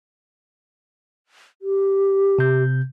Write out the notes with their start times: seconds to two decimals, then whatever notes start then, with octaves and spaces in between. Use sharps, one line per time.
1.62 G4
2.39 C3 G6